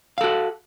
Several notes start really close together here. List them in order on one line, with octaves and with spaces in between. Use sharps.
F5 A4 F#4